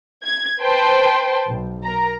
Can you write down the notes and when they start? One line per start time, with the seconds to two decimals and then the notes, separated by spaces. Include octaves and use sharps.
0.24 G#6
0.60 B4 C5 G5 A5 C6
1.48 B1
1.85 A#4 A#5